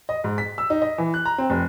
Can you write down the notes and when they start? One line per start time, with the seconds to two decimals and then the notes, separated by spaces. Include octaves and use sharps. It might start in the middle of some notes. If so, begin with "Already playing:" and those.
0.09 D#5
0.24 G#2
0.38 B6
0.58 E6
0.70 D#4
0.82 D#5
0.98 E3
1.14 F#6
1.25 A#5
1.38 C4
1.50 F1